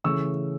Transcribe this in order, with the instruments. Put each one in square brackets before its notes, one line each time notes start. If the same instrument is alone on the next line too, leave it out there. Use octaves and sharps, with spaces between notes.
[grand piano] C#3 E3 A3 C#4 C#6 E6